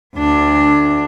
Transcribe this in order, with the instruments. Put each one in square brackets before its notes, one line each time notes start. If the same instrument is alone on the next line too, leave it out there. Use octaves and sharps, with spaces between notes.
[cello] D2 D4